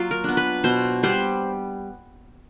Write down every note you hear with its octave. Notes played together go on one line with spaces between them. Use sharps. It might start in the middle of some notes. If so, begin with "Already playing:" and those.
Already playing: F#3 A#3 F4
A#4
B3 D4
B4
B2 C5
G3 B3 C5